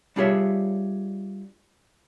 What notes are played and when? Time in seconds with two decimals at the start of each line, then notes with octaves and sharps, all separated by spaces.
0.16 G3 D4 F4 G#4 C#5 E5